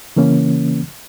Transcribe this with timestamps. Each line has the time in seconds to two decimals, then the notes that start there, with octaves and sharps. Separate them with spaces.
0.16 C#3 E3 A#3 C#4